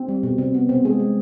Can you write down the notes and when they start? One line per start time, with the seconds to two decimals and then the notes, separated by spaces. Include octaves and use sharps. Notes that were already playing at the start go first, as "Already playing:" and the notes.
Already playing: C4
0.09 G3
0.23 B2
0.38 C3 C4
0.54 C3 B3
0.69 B2 C4
0.85 G#3 G#4
0.99 G#3